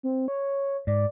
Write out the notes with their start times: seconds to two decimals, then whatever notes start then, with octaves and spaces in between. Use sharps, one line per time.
0.03 C4
0.28 C#5
0.87 G#2 D5